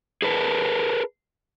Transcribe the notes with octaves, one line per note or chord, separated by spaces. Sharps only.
G#4 A#4 B4 A5